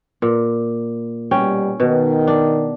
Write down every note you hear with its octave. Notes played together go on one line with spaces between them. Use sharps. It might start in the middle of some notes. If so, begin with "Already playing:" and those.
A#2
B2 G3 C#4 G5
B2 D#3
D4